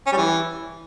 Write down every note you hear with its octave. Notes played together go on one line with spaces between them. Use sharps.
C#4
G3
E3